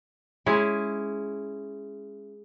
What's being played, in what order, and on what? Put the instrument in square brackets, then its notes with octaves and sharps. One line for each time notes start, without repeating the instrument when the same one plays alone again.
[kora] G#3 C#4 E4